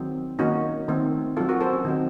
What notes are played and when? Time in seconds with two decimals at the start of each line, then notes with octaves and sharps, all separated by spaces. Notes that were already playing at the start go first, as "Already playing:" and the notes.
Already playing: D#3 F#3 C4
0.39 D#3 A#3 C#4 D#4 F#4
0.89 D#3 A3 C4
1.37 F#3 C4 F4 A4
1.49 F#4 A#4
1.61 A4 C5
1.73 C#4
1.85 D#3 F#3 C4 D#4